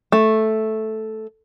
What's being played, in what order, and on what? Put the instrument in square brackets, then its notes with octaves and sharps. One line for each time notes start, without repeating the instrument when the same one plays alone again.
[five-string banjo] A3